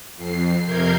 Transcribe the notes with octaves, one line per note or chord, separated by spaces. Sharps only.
F2 C7
F2 C3 A#4 G6 G#6 C7